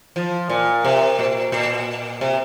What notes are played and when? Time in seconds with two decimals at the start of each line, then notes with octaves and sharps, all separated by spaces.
0.16 F3
0.50 A#2
0.84 C3
1.19 A#2
1.52 A#2
2.21 C3